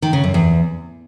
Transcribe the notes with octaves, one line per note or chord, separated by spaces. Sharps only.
D#3
C#3
F#2
E2